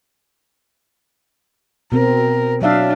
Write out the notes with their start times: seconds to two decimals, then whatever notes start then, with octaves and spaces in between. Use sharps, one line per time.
1.92 B2 C4 A#4
2.62 F#3 D4 E5 F5